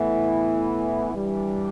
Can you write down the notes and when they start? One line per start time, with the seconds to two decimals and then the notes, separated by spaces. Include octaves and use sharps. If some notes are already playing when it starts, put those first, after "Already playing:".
Already playing: A2 E3 B3 E4
1.13 G2 E3 G3 D4